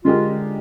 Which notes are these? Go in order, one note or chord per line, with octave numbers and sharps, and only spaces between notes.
D3 G#3 D4 F4 G4 A#4